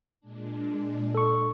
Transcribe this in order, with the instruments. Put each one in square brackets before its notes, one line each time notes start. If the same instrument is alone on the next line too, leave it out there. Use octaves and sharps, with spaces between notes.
[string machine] A#2 G#3 D4
[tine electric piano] A4 C#6